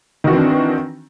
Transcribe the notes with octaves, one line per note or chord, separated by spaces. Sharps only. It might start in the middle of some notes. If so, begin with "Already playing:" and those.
D#3 E3 C4 D4 F#4